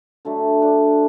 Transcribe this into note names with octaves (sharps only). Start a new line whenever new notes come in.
D3 F#3 A3 D4
D4